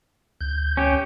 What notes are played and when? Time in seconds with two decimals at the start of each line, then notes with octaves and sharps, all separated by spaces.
0.41 D2 G6
0.77 C#4 G4